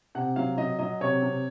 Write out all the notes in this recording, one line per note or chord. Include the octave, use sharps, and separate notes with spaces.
C3 F#5
F#3 F5
F#3 D#5
F#3 D#5
C3 C#5
C3